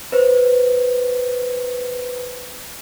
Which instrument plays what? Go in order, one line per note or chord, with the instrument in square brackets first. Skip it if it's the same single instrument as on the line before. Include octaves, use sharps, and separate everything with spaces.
[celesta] B4 C5